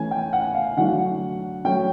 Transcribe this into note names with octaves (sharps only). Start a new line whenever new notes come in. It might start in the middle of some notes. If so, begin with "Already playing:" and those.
Already playing: E3 A3 C#4 G#5
G5
F#5
F5
D3 F#3 A3 D4 F#5
F#3 A3 C#4 G5